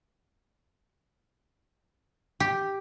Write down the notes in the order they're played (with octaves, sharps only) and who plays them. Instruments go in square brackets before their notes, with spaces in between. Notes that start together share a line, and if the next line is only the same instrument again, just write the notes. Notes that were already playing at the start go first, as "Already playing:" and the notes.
[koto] G4